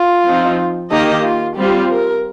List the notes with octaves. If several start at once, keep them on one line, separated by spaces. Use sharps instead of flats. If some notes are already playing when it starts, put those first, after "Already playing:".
Already playing: F4
F3 C4 D#4
D#3 A#3 D#4 G4 D#5
F4
G3 C4 F4 G4
A#4